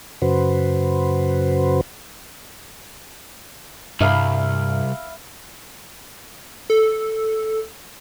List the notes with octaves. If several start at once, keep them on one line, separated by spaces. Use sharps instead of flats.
F#2 C#3 F#4 B4 C5
C2 G2 E5 F5 B5
A4